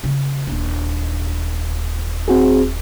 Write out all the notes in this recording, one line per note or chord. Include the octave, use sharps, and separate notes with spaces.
C#3
D#1 D4
C4 F#4 G#4